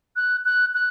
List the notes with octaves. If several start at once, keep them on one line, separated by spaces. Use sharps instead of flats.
F#6
F#6
F#6